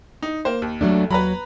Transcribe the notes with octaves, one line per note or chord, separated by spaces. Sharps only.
D#4
A#3 C5
D#2
F#3 A3 D4
D#2 F#3 B4 A#5 B5